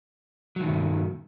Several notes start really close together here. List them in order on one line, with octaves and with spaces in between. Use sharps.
F#3 D#3 G2